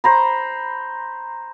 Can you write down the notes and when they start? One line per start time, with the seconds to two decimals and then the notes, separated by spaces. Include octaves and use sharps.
0.04 C5 A#5 B5